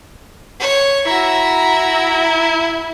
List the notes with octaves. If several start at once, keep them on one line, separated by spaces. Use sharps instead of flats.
C#5
E4 F#4 E5 A#5